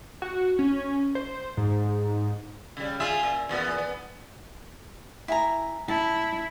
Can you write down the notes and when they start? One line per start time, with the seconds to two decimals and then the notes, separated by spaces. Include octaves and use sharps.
0.22 F#4
0.59 C#4
1.15 C5
1.57 G#2
2.77 C#3 G3
3.00 F4 G#4 E5
3.23 A#2
3.49 E2 A#2 B3
3.78 B3
5.28 E4 G#5 A#5
5.88 E4 A5